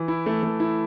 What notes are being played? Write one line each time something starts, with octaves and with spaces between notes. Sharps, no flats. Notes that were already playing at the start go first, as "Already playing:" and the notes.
Already playing: E3
E4
A3
A3
E4